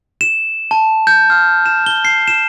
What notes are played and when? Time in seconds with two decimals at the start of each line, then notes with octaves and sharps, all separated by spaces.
0.21 E7
0.71 A5
1.07 G6
1.30 F6
1.66 E7
1.86 G7
2.05 C7
2.28 E7